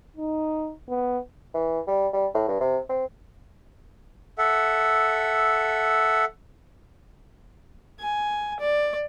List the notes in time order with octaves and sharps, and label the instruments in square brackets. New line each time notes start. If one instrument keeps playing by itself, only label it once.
[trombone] D#4
B3
[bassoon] E3
G3
G3
A2
G2
C3
C4
[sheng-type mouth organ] A4 E5 F#5
[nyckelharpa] G#5
D5